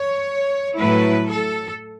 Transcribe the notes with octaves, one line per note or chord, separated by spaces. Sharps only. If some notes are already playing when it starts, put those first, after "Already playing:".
Already playing: C#5
A2 F#3 A3 E4 B4
A4